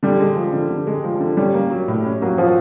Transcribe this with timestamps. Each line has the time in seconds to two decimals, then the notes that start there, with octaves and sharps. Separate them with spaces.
0.03 D3 G3
0.20 G#3
0.36 F3
0.53 D3
0.70 D3
0.87 G#3
1.04 F3
1.20 D3
1.37 G3 C#4
1.54 A#3
1.70 F#3
1.88 A2
2.05 C#4
2.22 F#3 A#3
2.38 F3 F#3